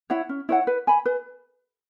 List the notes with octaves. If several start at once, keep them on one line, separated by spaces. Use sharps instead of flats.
E4 C#5 F#5
C#4
E4 C#5 F#5
B4
G#5 B5
B4